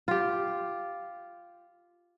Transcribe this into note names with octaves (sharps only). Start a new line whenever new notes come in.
F4 G4